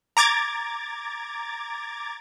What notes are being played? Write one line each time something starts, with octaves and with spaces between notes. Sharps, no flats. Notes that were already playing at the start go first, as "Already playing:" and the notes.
A#5 D6 G#6 A6